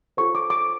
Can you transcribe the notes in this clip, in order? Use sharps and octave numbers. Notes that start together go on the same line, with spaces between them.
F4 A4 C5 C#6
D6
D6